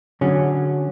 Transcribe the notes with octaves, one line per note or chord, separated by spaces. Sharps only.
D3 F#3 C#4 G#4